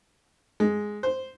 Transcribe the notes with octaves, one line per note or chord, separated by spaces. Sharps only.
G#3
C5